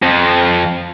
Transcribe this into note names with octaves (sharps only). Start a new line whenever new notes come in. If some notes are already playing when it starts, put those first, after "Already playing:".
F2